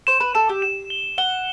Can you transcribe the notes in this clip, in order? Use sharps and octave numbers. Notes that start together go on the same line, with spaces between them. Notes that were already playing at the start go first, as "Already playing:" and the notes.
C5 E7
B4
A4 E7
G4
E7
G7
F#5 G7